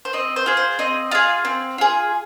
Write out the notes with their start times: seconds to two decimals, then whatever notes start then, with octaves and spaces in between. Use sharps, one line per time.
0.05 C5
0.13 C4 D#5
0.36 C5
0.46 F4 G#4
0.57 C5
0.79 C4 D#5
1.11 F4 G#4 F5
1.45 C4
1.78 F4 G#4